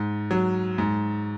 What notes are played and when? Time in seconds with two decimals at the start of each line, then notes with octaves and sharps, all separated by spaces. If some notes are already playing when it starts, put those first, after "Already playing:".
Already playing: G#2
0.31 F#3
0.78 G#2